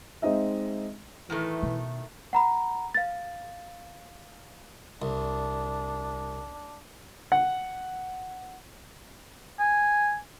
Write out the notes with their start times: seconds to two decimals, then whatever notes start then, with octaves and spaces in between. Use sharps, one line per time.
0.22 G#3 C4 D#4 D#5 E5
1.30 A2 D#3 E3 A3
1.63 B2
2.33 F#5 A#5 B5
2.95 F5 A6
5.02 C2 D4
7.32 F#5
9.59 G#5